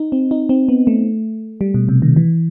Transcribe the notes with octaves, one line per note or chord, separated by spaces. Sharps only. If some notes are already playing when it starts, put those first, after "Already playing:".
Already playing: D#4
C4
D#4
C4
B3
A3
G3
B2
C3
D#3
E3